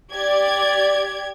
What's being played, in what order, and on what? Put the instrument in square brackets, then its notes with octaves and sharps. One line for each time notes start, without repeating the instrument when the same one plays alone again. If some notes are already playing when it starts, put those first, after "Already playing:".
[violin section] G4 G#6 [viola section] D5